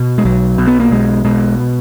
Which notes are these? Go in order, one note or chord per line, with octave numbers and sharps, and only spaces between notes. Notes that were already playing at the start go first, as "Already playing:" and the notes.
Already playing: B2
G#3
B1 F#3
B2
B3
A#3
B1 G#3
B2 G#3